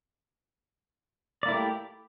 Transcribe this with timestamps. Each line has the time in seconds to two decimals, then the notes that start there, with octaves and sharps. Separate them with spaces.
1.43 D5
1.46 A#3
1.48 E4
1.51 A3
1.53 G4